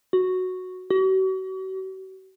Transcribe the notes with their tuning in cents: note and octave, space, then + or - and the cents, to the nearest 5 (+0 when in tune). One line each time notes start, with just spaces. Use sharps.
F#4 -5
F#4 +40